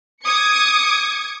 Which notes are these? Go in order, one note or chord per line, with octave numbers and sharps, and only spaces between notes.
D6 D#6 G#6 C#7